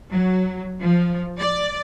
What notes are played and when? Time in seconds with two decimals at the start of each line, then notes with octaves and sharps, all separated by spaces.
0.12 F#3
0.81 F3
1.40 D5